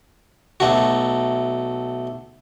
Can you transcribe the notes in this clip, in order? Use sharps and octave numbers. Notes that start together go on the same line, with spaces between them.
B1 A3 F#4